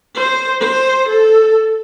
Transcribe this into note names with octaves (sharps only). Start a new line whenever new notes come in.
C5
C5
A4